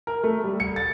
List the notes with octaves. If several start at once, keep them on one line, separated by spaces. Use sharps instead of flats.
A#4
A3
G3
C#7
A6